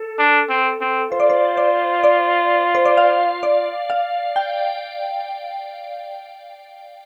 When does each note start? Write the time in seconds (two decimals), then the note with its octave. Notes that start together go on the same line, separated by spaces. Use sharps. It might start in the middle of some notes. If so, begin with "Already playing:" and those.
Already playing: A4
0.19 D4
0.49 C4
0.81 C4
1.12 F4 C5
1.20 D5
1.30 C5
1.57 D5
2.04 D5
2.75 C5
2.85 D5
2.97 F5
3.43 D5
3.90 F5
4.36 G5